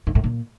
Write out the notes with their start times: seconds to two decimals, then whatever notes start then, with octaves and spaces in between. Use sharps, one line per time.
0.07 G#2
0.15 A2
0.24 A#2